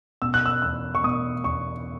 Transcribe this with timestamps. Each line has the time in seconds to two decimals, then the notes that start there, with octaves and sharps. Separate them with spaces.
0.22 B2 E6
0.34 F#6
0.46 E6
0.62 E2 E6
0.95 C#6
1.04 B2 D#6
1.44 E2 C#6